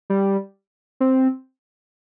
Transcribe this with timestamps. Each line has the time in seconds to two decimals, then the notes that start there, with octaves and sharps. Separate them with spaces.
0.10 G3
1.00 C4